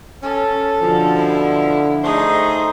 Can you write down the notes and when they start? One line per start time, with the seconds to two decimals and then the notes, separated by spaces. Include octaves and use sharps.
0.23 C#4 A4
0.80 B2 D3 F3
1.16 E4
2.04 A3 D#4 G#4 C5